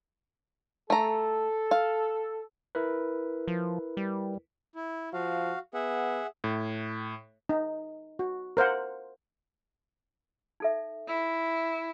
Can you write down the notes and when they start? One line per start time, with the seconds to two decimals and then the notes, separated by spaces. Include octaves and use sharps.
0.90 A3 A4 A#5
1.71 F5
2.75 E4 A#4 B4
3.48 F3
3.97 G3
4.75 E4
5.13 F3 F#4 F5
5.74 B3 G#4 E5 F#5
6.44 A2
7.49 D#4
8.19 F#4
8.57 A#4 C5 F5 F#5
10.60 D#4 A4 E5
11.08 E4